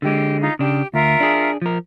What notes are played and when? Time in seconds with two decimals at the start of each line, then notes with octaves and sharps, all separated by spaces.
0.02 D3 G#3 G4
0.41 D#4 F4
0.59 C#3 D4 G4
0.94 D2 F4 A#4 E5
1.20 D4 G#4
1.62 F3 A#4